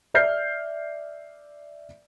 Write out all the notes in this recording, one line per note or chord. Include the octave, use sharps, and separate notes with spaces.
D5 E5 F6 G6 C7